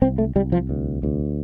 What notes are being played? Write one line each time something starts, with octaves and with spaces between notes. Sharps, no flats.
C2 C4
A3
C2 G3
F3
D2
D2